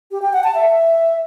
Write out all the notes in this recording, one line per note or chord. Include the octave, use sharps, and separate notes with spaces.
G4
G5
F#5
A5
E5